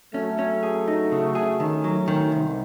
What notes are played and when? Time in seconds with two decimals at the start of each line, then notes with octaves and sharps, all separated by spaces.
0.14 F#3 A3 C#4
0.39 C#4
0.63 G#4
0.88 D#4
1.12 C#3
1.35 G#4
1.60 D#3 A3 C#4
1.84 F#3
2.08 D#3
2.32 C2 C4 D#4